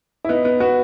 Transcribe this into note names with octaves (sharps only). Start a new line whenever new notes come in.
E4
B3 D#4
B3
B3 F#4